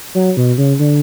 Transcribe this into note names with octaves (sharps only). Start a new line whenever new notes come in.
F#3
B2
C#3
D3